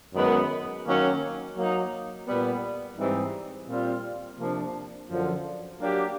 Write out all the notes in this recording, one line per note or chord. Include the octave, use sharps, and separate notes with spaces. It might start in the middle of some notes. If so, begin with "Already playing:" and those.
F#2 D#3 G#3 B3
D#3 F#3 A#3 C#4
F#3 A#3 D#4
A#2 G3 B3
G#2 E3 G3 C4 D#4
A#2 G3 C4 F4
C3 F3 A#3 D4
F#2 D3 F3
F#3 A#3 D4 G4